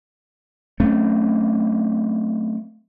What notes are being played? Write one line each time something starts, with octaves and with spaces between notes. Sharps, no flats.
F#3 A3 C4 C#4